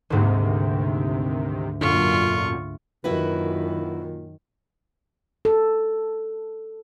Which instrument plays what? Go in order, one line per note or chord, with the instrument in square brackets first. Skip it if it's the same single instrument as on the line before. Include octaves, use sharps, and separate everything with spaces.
[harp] D2 G#2 A#3 [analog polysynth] C3 D#3
[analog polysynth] F#2 A#2 D3 [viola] F4 C#6
[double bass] F#2 D#3 [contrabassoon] A#2 [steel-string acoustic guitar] E4 F#4 B4
[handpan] A4